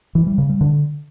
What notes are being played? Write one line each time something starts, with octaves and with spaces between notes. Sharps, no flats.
E3
G3
C#3
G3
D3